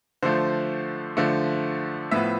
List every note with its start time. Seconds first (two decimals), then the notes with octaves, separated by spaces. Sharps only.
0.23 D3 F3 A3 C5
1.17 D3 F3 A3
2.11 A2 F3 B3 E5